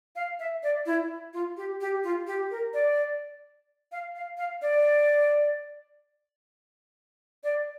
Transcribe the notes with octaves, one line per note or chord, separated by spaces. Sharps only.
F5
E5
D5
E4
F4
G4
G4
F4
G4
A#4
D5
F5
F5
F5
D5
D5